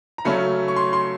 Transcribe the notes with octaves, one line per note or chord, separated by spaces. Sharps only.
A#5
C#3 F#3 A3 C#4 B5
C#6
C6
C6